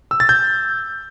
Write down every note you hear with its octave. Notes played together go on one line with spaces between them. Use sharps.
E6
A6
G6